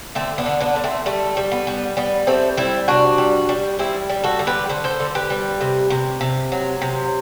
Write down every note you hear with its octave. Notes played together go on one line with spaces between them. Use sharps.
D3 A3 C4
B3 D4
D3
B3 D4
D3
A3 C4
G3 A3
G3
B3
G3
G3 B3
G3 A3 C4
G3 C4 E4
C3 D4 F#4
G3
G3
G3 C4 E4
G3
F#4 A4
D3
G4 B4
D3 C5
A4 C5
D3
G4 B4
G3
C3
C3
C3
F#3
C3